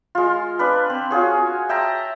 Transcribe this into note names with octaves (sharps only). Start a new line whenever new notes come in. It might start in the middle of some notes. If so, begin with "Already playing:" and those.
G#3 F4
D4 B4
C4
F4 F#4 G#4 C#5
E5 G5 A5 A#5